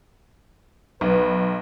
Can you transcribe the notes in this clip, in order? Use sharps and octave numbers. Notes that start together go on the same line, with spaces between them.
B1 B4